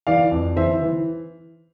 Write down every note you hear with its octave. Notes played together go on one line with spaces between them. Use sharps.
E3 D5 F5
F2
E3 C5 E5
E3